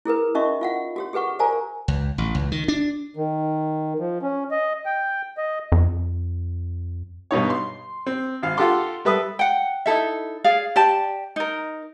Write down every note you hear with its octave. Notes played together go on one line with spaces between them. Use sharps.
E4 G#4 A#4 B4
C#4 D#4 F#4 D#5 E5 C#6
F4 F5 F#5
F#4 G4 C#5
G4 G#4 B4 F#5 C#6
A#4 C5 D5 F5 G#5 A#5
C#2
A1
C#2
D#3
D4
D#3
F3
C#4
D#5
G5
D#5
F2
G2 B2 D#4 C#5
C6
C4
G#1 F5
F4 G4 A4 F#5 C6 D6
G3 A4 B4 E5 D#6
F#5 G5
D#4 E4 A4 E5
G#4 D5 F5
G4 D5 A5
D#4 A#4